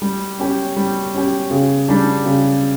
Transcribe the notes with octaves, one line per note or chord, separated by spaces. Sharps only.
G3
C#4 G4
G3
C#4 G4
C#3
G3 D4
C#3